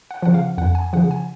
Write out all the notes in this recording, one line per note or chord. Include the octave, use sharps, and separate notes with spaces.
F#5
C#3 F3 F#5
F5
F2 F#5
G#5
C#3 F3 F#5
G#5